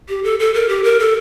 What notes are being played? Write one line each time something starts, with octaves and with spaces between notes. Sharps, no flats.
G4
A4
A4
A#4
G4
A#4
A4